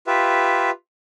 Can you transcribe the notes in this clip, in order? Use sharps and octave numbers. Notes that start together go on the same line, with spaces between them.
F4 G4 B4 E5